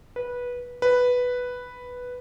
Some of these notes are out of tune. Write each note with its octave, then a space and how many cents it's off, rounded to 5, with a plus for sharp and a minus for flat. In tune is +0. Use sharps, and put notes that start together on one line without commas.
B4 -15
B4 +0